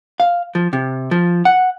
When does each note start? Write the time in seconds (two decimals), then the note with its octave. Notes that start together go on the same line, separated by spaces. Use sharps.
0.20 F5
0.55 F3
0.73 C3
1.11 F3
1.45 F#5